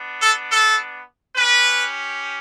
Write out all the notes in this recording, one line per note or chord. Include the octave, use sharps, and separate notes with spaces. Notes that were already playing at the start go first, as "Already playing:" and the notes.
Already playing: B3 D4
A4
A4
C#4 G4 B4